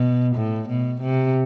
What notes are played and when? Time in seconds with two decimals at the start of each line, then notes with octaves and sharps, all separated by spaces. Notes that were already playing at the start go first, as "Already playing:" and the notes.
Already playing: B2
0.36 A2
0.69 B2
1.01 C3